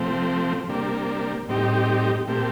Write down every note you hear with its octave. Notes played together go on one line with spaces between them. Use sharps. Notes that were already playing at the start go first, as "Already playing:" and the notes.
Already playing: C3 F3 A3 C4
C3 G3 A#3 D4
A2 G3 C4 D#4 G4
A#2 A3 C4 G4